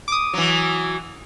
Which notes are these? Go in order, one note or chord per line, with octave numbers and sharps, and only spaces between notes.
D6 D#6
E3 F#3